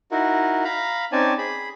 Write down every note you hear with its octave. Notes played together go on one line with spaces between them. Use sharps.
D#4 E4 F#4 A#4
F5 A#5 B5
C4 C#4 D#4 D5 G#5 A5
G#4 B5